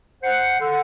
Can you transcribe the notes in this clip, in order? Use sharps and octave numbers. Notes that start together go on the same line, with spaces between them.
C5 F#5
D3